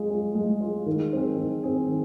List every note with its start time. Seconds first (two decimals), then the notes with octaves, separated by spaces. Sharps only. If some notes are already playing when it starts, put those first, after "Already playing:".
Already playing: G#3 F4 G#4
0.10 F4 G#4
0.35 G#3
0.61 F4 G#4
0.86 D#3
1.13 C4 G#4
1.38 D#3
1.63 C4 G#4
1.88 D#3